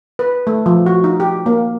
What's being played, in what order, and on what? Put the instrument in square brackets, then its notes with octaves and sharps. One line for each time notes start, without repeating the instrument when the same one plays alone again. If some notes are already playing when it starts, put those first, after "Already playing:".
[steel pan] B4
A3
F3
F#4
D#4
G4
A#3